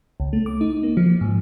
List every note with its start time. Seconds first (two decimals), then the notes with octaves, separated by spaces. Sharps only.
0.20 C#2
0.33 A3
0.46 D6
0.61 D#4
0.83 A#3
0.97 F3
1.21 G#2